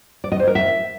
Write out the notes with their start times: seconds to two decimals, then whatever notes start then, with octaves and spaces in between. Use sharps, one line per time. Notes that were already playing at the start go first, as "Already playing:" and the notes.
0.24 D5
0.32 D#5
0.40 C5
0.47 A#4
0.55 E5